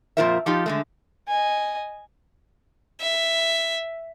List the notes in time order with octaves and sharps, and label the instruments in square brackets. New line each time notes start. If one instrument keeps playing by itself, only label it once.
[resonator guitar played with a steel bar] F2 A#2 F4 A#4 C5 E5
F3 D#4 F4 G4
D3 G#3 A3
[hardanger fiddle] D#5 G#5
E5